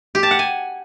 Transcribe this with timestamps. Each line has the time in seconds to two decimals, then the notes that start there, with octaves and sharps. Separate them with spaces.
0.15 G4
0.23 A5
0.31 F#5
0.39 G#5